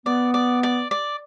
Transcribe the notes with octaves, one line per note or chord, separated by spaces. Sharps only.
B3 D5
D5
D5
D5